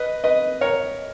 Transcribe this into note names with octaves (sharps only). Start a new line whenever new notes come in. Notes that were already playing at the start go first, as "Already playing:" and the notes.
Already playing: B4 D#5
B4 D#5
A#4 C#5